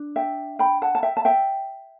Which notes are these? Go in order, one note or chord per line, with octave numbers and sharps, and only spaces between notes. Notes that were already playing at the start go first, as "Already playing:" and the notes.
Already playing: D4
E5 G5
G5 B5
F#5 A5
A5
E5 G5
A5
E5 G5